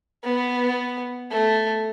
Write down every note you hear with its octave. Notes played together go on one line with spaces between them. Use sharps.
B3
A3